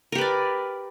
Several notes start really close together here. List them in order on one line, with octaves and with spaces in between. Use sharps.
A#4 G4 B4 D5